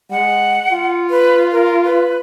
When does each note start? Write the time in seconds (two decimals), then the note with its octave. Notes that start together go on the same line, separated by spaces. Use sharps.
0.11 G#3 F#5
0.72 F4
1.10 B4
1.52 A#4
1.85 B4